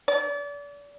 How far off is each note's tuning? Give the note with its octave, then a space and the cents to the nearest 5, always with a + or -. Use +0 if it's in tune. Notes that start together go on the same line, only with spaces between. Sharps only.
D5 -35